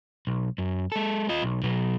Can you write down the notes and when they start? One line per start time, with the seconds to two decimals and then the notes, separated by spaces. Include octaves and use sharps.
0.27 B1
0.58 F#2
0.92 G#3 A4
1.29 F4 D#5
1.43 B1
1.63 B2 F#3